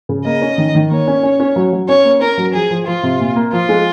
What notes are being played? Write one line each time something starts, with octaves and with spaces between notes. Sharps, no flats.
C#3
A#3 D#5
C#4
D#3
D#3
A#3 C#5
C#4
C#4
C#4
F#3
F#3
C#4 C#5
A#3
C#4 A#4
F#3
F3 G#4
F3
F3 F4
C3
A#2
A#3
F3 F4
G#3